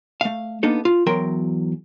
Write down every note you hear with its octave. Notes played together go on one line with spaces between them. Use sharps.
A3 F5
A#3 B3 D4 D#4 A4
F4
E2 F#3 A#4 G5 C6